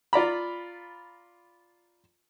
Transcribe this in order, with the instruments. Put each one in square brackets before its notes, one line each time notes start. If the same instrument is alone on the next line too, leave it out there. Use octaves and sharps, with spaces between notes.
[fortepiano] F4 D5 A#5 B5